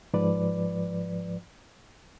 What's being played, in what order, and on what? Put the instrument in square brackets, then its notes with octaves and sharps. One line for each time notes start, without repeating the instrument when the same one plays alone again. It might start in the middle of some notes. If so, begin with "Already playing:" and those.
[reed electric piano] G#2 F3 B4 D5